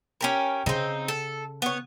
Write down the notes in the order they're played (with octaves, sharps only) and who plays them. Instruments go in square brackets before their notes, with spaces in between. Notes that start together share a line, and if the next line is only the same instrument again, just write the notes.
[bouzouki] C#4 G4 A#4
[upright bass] C#3 [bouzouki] C4 D#4
[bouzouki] A4
B3 C#5